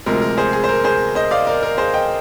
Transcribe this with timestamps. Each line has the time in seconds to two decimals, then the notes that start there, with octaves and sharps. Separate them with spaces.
0.06 D2 C3 F3 G#3 A#4
0.22 A#4
0.37 G#4 C5
0.53 G#4
0.64 C5
0.69 A#4
0.84 G#4 C5
1.15 C5 D#5
1.31 D5 F5
1.47 A#4 D5
1.63 A#4
1.78 G#4 C5
1.94 D#5 G5